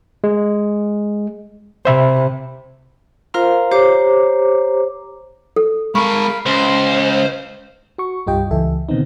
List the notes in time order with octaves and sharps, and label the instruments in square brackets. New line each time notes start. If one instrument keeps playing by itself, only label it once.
[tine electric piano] G#3
[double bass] C3 [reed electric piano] C5 E5 B5
[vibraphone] F4 A#4 C5 F5 A#5 C6
G4 C5 C#5 A#5 D6
[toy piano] A4
[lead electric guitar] G#3 A#4 [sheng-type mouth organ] F5 B5 [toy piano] C#6
[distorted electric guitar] C#2 [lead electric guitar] C5 [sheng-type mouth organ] F5
[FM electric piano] F#4 C#6
C2 G2 F4 G4 D#5 G5
C#2 E3 A4 E5
B2 D3 D#3 B3 C4 D#4